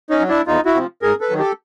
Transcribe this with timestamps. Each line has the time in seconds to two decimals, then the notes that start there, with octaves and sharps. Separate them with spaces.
0.10 C#4 D#4
0.20 F#3
0.29 D4 E4
0.47 E2 D#4 F4
0.65 E4 F#4
0.74 C3 F3
1.02 G#2 G#4 A#4
1.21 A4 B4
1.30 D#3 F#3
1.39 G4 A4